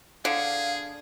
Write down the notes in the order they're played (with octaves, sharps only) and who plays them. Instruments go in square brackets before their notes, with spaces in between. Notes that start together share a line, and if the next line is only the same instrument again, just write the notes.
[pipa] D3 [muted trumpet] G#4 [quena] F5